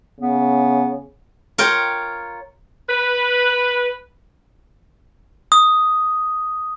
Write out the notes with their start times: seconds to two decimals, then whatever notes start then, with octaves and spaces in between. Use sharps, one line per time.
0.20 C#3 B3
1.58 F4 A#4 C#5 G5
2.89 B4
5.52 D#6